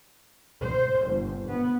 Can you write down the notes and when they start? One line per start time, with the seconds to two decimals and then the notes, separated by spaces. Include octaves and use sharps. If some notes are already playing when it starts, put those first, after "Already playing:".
0.63 C5
1.03 G1
1.47 B3